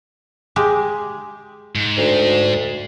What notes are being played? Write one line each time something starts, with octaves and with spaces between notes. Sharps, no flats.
G#3 G4
G#2
D2